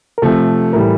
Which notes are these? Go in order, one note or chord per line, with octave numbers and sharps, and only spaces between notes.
A#4
C3 F3 A3 A4
A2 E3 G3 A#4